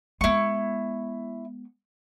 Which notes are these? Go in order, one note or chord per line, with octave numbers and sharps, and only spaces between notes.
G#3 B3 E4 C#6